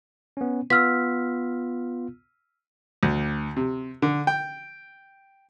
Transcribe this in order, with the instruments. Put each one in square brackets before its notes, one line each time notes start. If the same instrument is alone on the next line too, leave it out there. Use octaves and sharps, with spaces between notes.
[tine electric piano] B3 C#4
[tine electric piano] B3 F4 [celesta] E6 F6 B6
[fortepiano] D2
C3
D3
G5